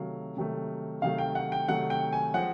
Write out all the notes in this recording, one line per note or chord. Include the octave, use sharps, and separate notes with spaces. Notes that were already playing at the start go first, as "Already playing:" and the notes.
Already playing: C3 D#3 F#3 A3 F5
C3 D#3 F#3 A3
C3 D#3 F#3 A3 F5
G5
F#5
G5
C3 D#3 F#3 A3 F#5
G5
G#5
F3 G#3 C4 F#5